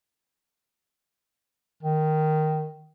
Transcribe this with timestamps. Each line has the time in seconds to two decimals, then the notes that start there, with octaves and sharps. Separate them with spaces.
1.83 D#3